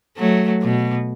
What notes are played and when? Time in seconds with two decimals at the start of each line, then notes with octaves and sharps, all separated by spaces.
0.18 F#3 A3
0.62 B2